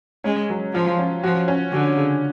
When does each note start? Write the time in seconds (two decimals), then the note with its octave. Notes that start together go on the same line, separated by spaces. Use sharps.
0.24 G#3 C#4
0.50 F#3
0.74 F3 F4
0.99 C#4
1.24 F3 F#4
1.48 C#4
1.72 D3 F#4
1.97 C#3